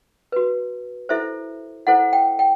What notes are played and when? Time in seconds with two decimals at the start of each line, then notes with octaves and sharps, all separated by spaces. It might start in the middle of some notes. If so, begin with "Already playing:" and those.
0.32 F#4 B4
1.09 E4 A4 C5 E5
1.87 E4 A4 C5 F#5
2.13 G5
2.39 G5